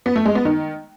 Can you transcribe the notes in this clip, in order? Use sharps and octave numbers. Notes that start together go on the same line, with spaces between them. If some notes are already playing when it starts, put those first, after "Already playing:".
B3
A3
G#3
B3
D#3